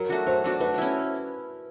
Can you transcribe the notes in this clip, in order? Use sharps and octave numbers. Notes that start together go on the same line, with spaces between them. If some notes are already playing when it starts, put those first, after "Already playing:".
Already playing: F#3 A#4
A3 D4 F#4
F#3 C5
A3 D4 F#4
A3 B4
C#4 E4